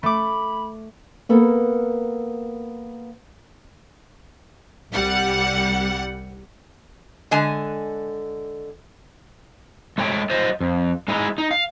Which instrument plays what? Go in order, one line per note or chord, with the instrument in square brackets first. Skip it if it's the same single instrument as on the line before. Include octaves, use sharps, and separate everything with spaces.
[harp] A3 D6 [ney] B5
[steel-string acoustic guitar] A#3 B3 A4 A#4
[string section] C2 G3 F#5
[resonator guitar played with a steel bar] D3 G#3 G#5
[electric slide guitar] G#3 A3 C#5 G5
F#3 C5 D#5
F2
G#3 D#4 E4 G#4 D#5
D#4
F5